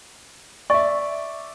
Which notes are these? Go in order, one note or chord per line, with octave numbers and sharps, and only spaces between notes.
D5 E5 C#6